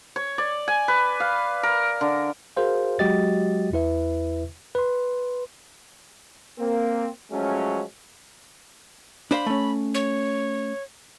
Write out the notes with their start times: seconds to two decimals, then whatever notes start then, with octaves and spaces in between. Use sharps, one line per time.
0.16 C#5
0.38 D5
0.68 G#5
0.88 B4
1.20 F5
1.63 A#4
2.01 D3
2.57 F#4 G#4 A#4 C5 F5
2.99 F#3 G#3 F#4 G4 D#5 A6
3.72 E2 E4 B4 E5
4.75 B4 C6
6.59 A#3 C4
7.32 F3 F#3 G#3 A3 C#4
9.31 D4 C5 F5 B5
9.46 A3 C#4
9.94 C#5